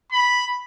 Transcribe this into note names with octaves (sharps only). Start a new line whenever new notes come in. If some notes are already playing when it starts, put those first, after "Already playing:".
B5